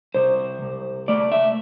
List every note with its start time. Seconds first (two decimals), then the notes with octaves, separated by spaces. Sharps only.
0.15 C2 C5
0.62 C2
1.08 A3 D5
1.32 E5